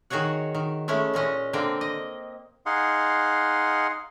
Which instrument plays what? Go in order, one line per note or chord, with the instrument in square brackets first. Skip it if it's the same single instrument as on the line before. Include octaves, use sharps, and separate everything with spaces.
[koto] D#3 F#4 G#4 C#5 F#5
D#3
G#3 A3 C#4 E4
A#2 G#3 C#4 D#5
D3 A#3 C4 G5
D#5
[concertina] D#4 G#4 F5 F#5 C6